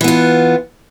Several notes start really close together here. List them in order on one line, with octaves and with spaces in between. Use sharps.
E3 B3 F4